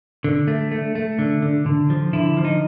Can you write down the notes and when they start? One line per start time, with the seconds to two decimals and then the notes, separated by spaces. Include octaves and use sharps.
0.24 D3
0.48 A3
0.71 A3
0.95 A3
1.19 D3
1.42 D3
1.66 D3
1.90 F3
2.13 D3 E4
2.37 F3
2.45 D#4